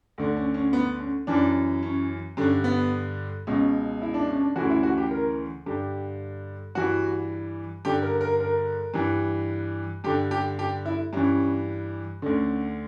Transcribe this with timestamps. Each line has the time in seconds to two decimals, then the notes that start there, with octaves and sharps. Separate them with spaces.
0.18 D2 D3
0.37 C#4
0.54 C#4
0.73 B3
1.00 C#4
1.27 F#2 E3 D4
1.83 C#4
2.37 G2 D3 C#4
2.64 B3
3.47 C#2 B2 C#4
4.02 E4
4.14 D4
4.27 C#4
4.40 D4
4.56 D2 C#3 E3 F#4
4.70 E4
4.83 F#4
4.98 G4
5.11 A#4
5.66 G2 D3 G4
6.75 G2 E3 F#4
7.85 G2 D3 G4
8.02 A#4
8.21 A#4
8.40 A#4
8.94 G2 E3
10.04 G2 D3 G4
10.31 G4
10.59 G4
10.86 E4
11.13 G2 E3 C#4
12.22 D2 D3 C#4